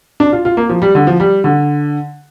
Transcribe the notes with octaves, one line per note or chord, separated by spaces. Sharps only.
D4
F4
F4
A#3
F3
G3
D3
F3
G3
D3